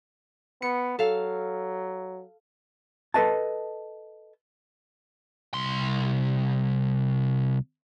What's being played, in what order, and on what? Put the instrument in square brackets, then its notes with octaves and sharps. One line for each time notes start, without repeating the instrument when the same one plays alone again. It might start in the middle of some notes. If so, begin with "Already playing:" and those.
[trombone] B3 [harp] C#7
[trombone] F#3 [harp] A4 F5
[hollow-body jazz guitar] A4 B4 D#5 A5
[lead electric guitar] C2 C6